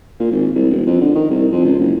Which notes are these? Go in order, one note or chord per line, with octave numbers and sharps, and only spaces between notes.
A#2
G#1
C2
E1
F2
D3
D#3
C2
F2
C#2
F#1